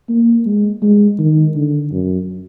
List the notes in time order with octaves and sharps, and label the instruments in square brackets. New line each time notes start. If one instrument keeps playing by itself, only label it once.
[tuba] A#3
G#3
G#3
D#3
D3
F#2